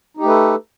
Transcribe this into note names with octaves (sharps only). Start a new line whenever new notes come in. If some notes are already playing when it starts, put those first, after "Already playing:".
A3 D#4 G4 A4 B4